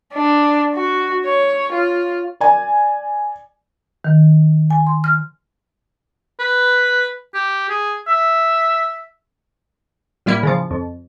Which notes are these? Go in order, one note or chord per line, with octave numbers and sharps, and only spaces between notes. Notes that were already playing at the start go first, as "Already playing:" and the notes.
D4
F#4
C#5
F4
D5 G#5
D#3
G#5
C6
F6
B4
G4
G#4
E5
A2 G3 A#3 E4
C#3 F3
F2